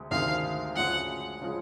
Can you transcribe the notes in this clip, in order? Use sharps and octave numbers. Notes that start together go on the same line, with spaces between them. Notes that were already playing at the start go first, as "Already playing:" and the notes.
Already playing: D2 C3 G#3
D2 C3 D#3 G#3 C4 F5
D2 C#3 F3 G#3 F#5
C#3 F3 G#3